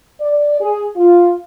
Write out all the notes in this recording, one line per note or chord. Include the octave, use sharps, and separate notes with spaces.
D5
G#4
F4